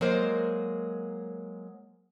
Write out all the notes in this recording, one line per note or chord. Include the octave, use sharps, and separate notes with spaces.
F#3 G#3 A#3 A#4 C5